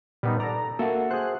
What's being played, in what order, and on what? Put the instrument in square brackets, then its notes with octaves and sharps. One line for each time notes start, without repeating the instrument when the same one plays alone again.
[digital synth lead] A#2 [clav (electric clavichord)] G3 B3 D#4
[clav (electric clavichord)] A4 D5 [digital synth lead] A#5
[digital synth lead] A#3 [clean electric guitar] F#4 E5 F#5 [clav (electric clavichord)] A4
[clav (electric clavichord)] G#4 C5 [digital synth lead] F#6